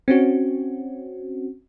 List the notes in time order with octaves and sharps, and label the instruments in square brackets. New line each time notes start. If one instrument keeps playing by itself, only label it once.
[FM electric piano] C4 C#4 F#4